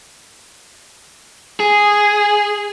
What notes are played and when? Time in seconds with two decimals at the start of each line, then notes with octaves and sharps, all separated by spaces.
1.60 G#4